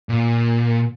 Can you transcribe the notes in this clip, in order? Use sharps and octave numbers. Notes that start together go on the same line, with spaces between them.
A#2